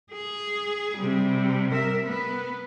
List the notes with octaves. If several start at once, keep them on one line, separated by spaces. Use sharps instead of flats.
G#4
C3 G3
A#4 E5
B3